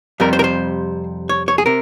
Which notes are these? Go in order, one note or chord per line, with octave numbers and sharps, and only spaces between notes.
F2 C3 G3 A#4
C5
A#4
C5
C#5
C#5
G#4
C3 A#4